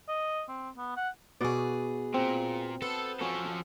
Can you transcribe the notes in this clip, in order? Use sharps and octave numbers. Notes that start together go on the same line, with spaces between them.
D#5
C4
B3
F#5
B2 F#4 G#4 B4 D5
A#2 C4
B3 A4 C5
F3 C#4 F#4 A4